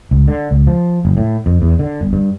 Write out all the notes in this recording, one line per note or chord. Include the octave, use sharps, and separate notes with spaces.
C#2
D3
C#2
F3
F#1
A2
F2
E2
D3
G1
G2